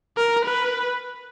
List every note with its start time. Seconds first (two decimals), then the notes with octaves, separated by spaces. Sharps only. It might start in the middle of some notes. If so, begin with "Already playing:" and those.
0.17 A#4
0.46 B4